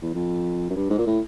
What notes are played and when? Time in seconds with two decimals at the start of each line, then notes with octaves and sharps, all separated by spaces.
0.02 E2
0.15 F2
0.70 F#2
0.76 G2
0.90 G#2
0.98 A#2
1.06 A2